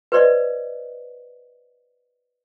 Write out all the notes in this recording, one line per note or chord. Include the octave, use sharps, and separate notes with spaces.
B4 C5 D5 D#5